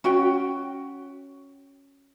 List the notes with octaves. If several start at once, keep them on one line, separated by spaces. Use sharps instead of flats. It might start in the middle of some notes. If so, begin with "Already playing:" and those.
C#4 F#4 G5